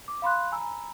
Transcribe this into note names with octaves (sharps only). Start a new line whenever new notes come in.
D6
F5 B5 C6 F#6
G#5 A#5 B5 E6